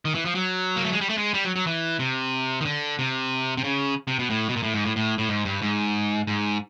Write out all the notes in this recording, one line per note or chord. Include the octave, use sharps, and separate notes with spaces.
D#3
E3
F3
F#3
A#3
A3
G#3
G3
A3
G#3
G3
F#3
F#3
E3
C3
D#3
D3
C3
C3
C#3
C3
B2
A2
B2
A#2
A2
G#2
A2
A2
A2
G#2
G2
G#2
G#2